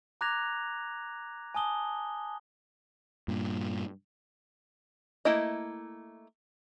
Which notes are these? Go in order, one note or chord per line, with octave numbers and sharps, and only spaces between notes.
A#5 D6 F#6 G#6 A#6 F7
G#5 A5 D#6 G7
G2 A#2
A3 A#3 E4 D#5